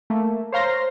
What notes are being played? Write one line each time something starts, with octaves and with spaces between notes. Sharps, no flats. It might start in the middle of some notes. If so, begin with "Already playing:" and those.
A3 A#3
C5 C#5 F5 A#5 C6 A#6